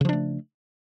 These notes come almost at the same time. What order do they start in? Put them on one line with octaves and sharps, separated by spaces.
C#3 F3 D4 A3